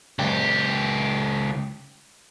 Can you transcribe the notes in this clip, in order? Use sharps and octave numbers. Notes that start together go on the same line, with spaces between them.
C#2 G4